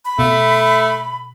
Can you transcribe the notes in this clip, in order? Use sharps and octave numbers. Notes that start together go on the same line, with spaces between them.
B5
B2 A3